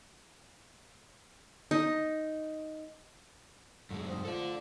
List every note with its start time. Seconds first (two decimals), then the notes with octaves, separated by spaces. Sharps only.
1.71 D#4
3.91 F#2 G#3 A3
4.07 G#2 C4
4.25 F3 A3 A4 D5